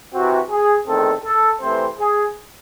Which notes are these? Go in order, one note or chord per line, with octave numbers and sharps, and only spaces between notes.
C3 E3 C4 F#4
G#4
E2 D#3 A3 C4 A4
A4
C3 E3 A3 C4 C5
G#4